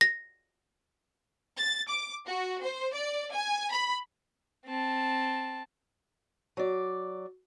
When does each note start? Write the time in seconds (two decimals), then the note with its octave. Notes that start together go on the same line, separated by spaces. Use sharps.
0.01 A#6
1.57 A6
1.88 D6
2.26 F#4
2.62 C5
2.94 D5
3.33 G#5
3.71 B5
4.65 C4 A5
6.57 F#3 D5